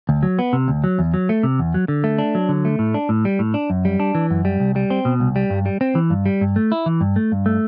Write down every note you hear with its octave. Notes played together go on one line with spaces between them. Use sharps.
D2
F#3
B3
C3
D2
F#3
E2
F#3
A3
C3
E2
F#3
D3
A3
D4
F#3
D3
A3
A2
D4
A2
G3
A2
D4
F#2
G3
D4
E3
F#2
G3
C2
G3
C4
B2
C2
G3
G2
G3
C4
E3
G2
G3
G2
A3
E4
E3
G2
A3
G2
A3